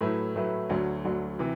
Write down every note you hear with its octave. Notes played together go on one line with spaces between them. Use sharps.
A2 F#3 A3 E4 B4
A2 F#3 A3 E4 B4
D2 D3 F#3
D2 D3 F#3
C3 E3